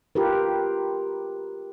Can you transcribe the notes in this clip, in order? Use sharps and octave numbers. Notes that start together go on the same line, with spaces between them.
F4 G4 A#4 B4